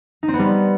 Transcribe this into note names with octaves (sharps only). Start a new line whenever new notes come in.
D#4
C4
B3
G3